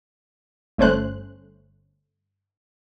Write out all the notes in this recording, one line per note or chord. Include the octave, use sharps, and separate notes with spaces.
G1 A3 C#4 C5 F#6